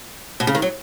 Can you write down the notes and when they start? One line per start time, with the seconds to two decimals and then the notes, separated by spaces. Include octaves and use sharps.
0.40 B2
0.47 C#3
0.55 D#3
0.62 F#3